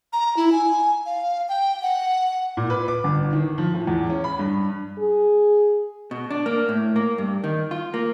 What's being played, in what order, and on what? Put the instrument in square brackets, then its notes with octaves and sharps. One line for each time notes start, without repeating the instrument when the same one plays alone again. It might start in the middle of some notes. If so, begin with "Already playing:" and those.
[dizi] A#5
E4
G#5
F5
G5
F#5
[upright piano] A#2
B4
D6
G1
D#3
F3
A2
E2
C#4
B5
G2
[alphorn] G#4
[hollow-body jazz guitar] B2
D4
A#3
A2
A#3
G2
D#3
F4
A#3